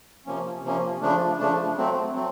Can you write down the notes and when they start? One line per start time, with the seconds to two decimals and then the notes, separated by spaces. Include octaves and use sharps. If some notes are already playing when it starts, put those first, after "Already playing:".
0.26 C3 F3 A#3 C#4
0.64 C3 F3 A#3 C#4
1.02 C#3 F3 A3 D4
1.39 C#3 F3 A3 D4
1.77 F#3 A3 C4
2.15 F#3 A3 C4